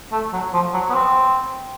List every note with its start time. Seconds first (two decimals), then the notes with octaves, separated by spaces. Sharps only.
0.12 A3
0.33 F#3
0.53 F3
0.74 F#3
0.90 B3
0.94 C4